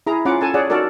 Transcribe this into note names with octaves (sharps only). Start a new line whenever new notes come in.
E4 G#4 A#5
C#4 F4 F#5 A#5 D6
A4 G#5 A5
G#4 C#5 D5 F#5
D#4 F#4 A4 A#4 D5